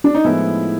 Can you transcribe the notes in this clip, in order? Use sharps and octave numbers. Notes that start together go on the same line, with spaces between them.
D4
D#4
A2 F3 G#3 B3 E4